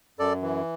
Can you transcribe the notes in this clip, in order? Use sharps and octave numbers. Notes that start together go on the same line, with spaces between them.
F#2 A4 D5
E3